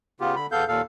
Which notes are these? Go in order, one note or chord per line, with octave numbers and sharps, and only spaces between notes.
C#3 B3 F4 G4
D3 B5
E2 B3 A4 F5 G6
D#2 A#2 A4 F5